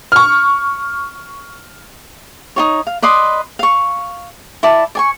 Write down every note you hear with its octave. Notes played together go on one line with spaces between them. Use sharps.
C#6 F6
D#4 F#4 C#5
F5
B4 D5 D#5 C6
F5 C#6
E4 D5 A5
D5 G#5 C#6